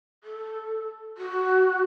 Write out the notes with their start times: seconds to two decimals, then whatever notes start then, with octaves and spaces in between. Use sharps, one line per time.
0.24 A4
1.18 F#4